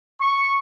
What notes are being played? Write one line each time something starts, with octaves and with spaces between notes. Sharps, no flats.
C#6